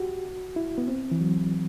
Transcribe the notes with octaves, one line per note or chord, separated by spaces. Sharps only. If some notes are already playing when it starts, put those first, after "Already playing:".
Already playing: F#4 G4
E4
B3
C4
E3
F#3